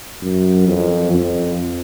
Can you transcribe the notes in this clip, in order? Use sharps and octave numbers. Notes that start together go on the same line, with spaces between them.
F#2
F2
F2